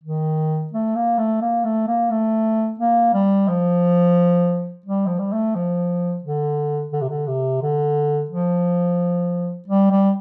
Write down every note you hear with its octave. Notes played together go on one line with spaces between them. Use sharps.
D#3
A3
A#3
A3
A#3
A3
A#3
A3
A#3
G3
F3
G3
F3
G3
A3
F3
D3
D3
C3
D3
C3
D3
F3
G3
G3